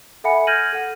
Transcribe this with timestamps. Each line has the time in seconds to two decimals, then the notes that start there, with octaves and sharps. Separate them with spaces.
0.24 A4 E5 F#5 G#5 B5 C#7
0.47 F6 G6 G#6 A#6 D#7 F#7
0.72 A4 F#5